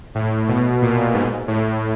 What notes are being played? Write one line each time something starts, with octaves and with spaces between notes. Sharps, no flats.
A2
B2
A#2
G#2
A2